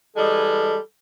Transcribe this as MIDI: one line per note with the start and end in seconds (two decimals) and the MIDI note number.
0.16 0.75 52
0.16 0.75 55
0.16 0.75 56
0.16 0.79 69